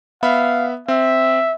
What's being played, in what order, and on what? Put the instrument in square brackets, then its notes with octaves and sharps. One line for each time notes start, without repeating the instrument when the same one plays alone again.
[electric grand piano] B3 E5 B5 [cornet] F5
[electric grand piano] C4 [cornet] E5